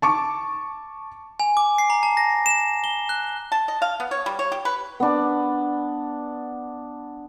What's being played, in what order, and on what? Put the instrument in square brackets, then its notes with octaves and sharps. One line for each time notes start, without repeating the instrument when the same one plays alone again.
[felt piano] A5 C#6 D6
[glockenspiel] G#5
D6
C7
A#5
A5
A#6
E7
G7
F#6
[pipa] A5
D#5
F5
B3
C#5
G3
C#5
G4
B4
[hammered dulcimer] B3 D4